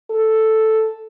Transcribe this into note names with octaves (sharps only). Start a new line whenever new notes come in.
A4